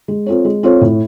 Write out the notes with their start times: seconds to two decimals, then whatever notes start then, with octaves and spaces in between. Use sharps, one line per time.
0.08 G#3
0.26 C4 F4 A4 C#5
0.45 G#3
0.63 C4 F4 A4 C#5
0.81 A2